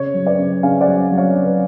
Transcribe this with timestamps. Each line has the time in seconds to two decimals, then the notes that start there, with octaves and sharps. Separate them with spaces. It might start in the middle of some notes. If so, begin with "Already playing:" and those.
Already playing: C#3 C#5
0.14 F#3
0.26 B4 D5
0.39 C#3
0.63 C#3 F5 G#5
0.81 D5 F#5
0.87 F#3
1.12 F#3
1.17 C#5 F5
1.36 C#3
1.44 B4